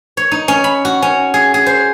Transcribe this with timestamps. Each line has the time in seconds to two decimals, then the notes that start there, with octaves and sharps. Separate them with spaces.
0.17 C#5
0.32 D#4
0.48 C#4
0.64 B5
0.85 F#4
1.02 C#4
1.34 G#4
1.54 G#4
1.66 C5